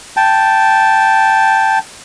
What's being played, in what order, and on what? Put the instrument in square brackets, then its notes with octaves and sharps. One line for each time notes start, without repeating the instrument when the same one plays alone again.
[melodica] G5 A5